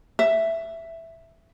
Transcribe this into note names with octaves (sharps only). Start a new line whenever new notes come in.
E5